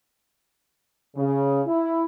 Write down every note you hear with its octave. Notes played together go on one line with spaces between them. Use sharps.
C#3
E4